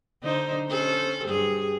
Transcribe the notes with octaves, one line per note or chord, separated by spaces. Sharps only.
D3 D#4 C5
C#4 A4 C5
G2 G#4